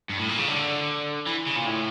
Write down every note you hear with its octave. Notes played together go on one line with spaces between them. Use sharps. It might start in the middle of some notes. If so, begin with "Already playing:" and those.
G2
A2
A#2
C#3
D3
E3
C#3
A#2
A2